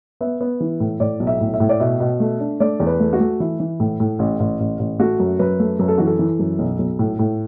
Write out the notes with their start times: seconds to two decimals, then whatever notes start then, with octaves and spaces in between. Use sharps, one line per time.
0.21 B3 E5
0.41 B3
0.60 E3
0.80 A2
1.00 A2 D5
1.20 B1
1.27 E5
1.41 A2
1.54 E5
1.60 A2
1.69 D5
1.80 B2 E5
2.00 B2
2.20 A3
2.40 D4
2.60 A3 D5
2.80 E2
2.87 B4
3.00 A3
3.13 F#4
3.20 A3
3.40 E3 E4
3.60 E3
3.80 A2
4.00 A2
4.19 A1
4.40 A1
4.60 A1
4.79 A1
4.99 A3 F#4
5.20 F#2
5.39 F#2 B4
5.60 A3
5.79 F#2 B4
5.88 A4
5.98 E3 F#4
6.07 A4
6.19 E3
6.39 F#2
6.59 B1
6.79 B1
6.99 A2
7.19 A2